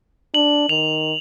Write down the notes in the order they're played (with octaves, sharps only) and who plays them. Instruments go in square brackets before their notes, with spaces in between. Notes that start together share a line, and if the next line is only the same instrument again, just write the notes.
[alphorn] D4 [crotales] F#7
[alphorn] D#3 [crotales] F7